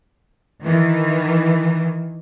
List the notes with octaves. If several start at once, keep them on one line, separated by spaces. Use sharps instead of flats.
D#3 E3